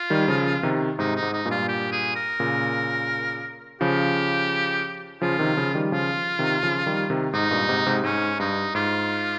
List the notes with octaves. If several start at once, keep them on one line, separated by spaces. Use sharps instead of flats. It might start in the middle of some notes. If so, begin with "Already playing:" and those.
Already playing: F4
D#3 G3
C#3 F3
C3 D#3
G#2 C3 D#4
D#4
G#2
D#4
G2 A#2
F4
G4
G#4
A#4
A#2 C#3
C#3 F3 G4
C#3 F3 F4
C3 D#3
C#3 F3
D#3 G3
C#3 F3 F4
C3 D#3
C#3 F3
D#3 G3
C3 D#3
G#2 D#4
G2 A#2
G#2 C3
G#2 C3
G#2 C#4
G2 D#4
G#2 F4